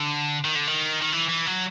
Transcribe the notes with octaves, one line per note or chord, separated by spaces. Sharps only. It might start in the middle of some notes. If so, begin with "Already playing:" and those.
Already playing: D3
D#3
D3
D#3
D#3
E3
E3
F#3